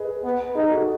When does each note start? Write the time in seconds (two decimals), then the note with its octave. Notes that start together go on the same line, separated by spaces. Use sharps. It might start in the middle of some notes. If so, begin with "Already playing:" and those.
Already playing: G#4 B4 D#5
0.24 B3
0.55 D#4 G#4
0.70 F#4 A4